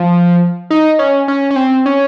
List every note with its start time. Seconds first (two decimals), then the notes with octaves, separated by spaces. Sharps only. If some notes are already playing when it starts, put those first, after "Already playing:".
Already playing: F3
0.71 D#4
0.99 C#4
1.28 C#4
1.51 C#4
1.56 C4
1.86 C#4